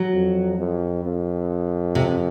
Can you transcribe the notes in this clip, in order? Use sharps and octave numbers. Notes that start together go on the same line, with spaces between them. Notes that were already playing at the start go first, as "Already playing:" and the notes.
Already playing: F#3
F2
F2
F2
C3